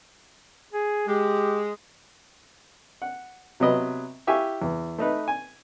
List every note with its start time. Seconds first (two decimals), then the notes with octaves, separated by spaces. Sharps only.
0.73 G#4
1.08 G#3 G4
3.02 F#5
3.60 C3 F#3 B3 D#5 B5
4.27 E4 G4 E5 F5 G#5 C#6
4.62 E2
4.98 A3 D#4 B4
5.28 G#5